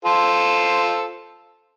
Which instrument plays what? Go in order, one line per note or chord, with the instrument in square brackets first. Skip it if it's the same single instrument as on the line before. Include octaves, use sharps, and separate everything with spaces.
[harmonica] F4 A4 C5